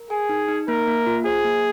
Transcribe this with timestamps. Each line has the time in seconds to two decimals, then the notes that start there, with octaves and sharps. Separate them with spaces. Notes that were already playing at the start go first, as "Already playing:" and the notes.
Already playing: A#4
0.10 G#4 G#5
0.29 D#4
0.48 D#4
0.68 A#3 A#4
0.88 A#3
1.06 F4
1.25 G#4 C5
1.44 A#3